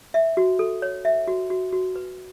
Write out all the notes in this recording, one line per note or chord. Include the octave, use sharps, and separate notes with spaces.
E5
F#4
A4
C#5
E5
F#4
F#4
F#4
B4